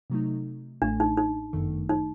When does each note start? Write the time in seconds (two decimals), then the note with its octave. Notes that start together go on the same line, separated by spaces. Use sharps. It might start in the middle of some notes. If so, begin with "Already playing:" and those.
0.10 C3 F#3 A3 D#4
0.82 A1 A2 A3 D4
1.00 D#4
1.17 D#4
1.53 G1 F#2 D#3 A3
1.89 D#4